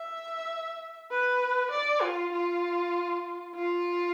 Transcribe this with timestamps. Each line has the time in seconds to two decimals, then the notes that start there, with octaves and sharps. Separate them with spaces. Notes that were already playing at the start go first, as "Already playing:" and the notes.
Already playing: E5
1.11 B4
1.71 D5
2.02 F4
2.33 F4
3.55 F4